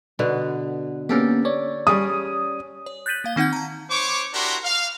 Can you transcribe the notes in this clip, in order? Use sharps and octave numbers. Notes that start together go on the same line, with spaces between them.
B2 D3 B3
A#3 B3 C#4 G4 A4 A#4
C#5 D5
G3 C#4 G#4 D#6
C#5
F#6 G6 A6 B6 D#7 F#7
A#3 F5 G7
D#3 C4 D#4 F#5 G6
A5 A#5
C5 C#5 C#6 D6
D4 E4 F#4 G4 A#4 C6
F5